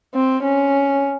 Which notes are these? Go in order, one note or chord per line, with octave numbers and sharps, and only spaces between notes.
C4
C#4